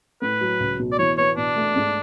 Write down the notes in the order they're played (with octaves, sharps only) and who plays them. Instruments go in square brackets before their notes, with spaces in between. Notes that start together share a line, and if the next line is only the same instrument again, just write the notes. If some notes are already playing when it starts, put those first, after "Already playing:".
[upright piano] A2 [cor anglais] B4
[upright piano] F#3
C#2
B2
[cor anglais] D5
[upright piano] E3 [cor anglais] C#5
[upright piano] B3 [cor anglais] C#5
[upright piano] B2 [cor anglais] D4
[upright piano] A3
G#2